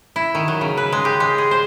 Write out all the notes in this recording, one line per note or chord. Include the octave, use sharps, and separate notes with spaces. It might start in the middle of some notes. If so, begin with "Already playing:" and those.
E4
D#3
F#3
C#3
B4
G#3
G4
G#3
G#4
C5